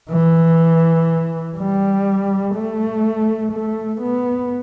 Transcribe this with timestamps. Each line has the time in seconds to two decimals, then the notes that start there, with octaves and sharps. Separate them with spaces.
0.10 E3
1.57 G3
2.55 A3
3.53 A3
4.01 B3